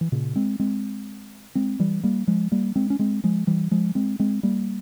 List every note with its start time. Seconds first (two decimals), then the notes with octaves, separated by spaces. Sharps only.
0.01 E3
0.12 A#2 C#3
0.36 G#3 C4
0.59 G#3 C4
1.55 G#3 C4
1.79 E3 G3
2.03 G3 A#3
2.27 F3 G#3
2.52 G3 A#3
2.76 G#3 C4
2.90 C#4
2.99 G#3 C4
3.24 F3 G#3
3.47 E3 G3
3.71 F3 G#3
3.95 G#3 C4
4.19 G#3 C4
4.43 G3 A#3